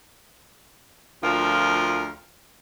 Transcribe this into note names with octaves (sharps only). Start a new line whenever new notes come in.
D2 F3 F4 A#4